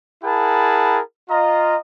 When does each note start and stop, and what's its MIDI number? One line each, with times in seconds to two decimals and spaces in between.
0.23 0.99 64
0.23 0.99 68
0.23 0.99 70
0.23 0.99 78
0.23 0.99 81
0.23 0.99 83
1.30 1.76 65
1.30 1.76 75
1.30 1.76 82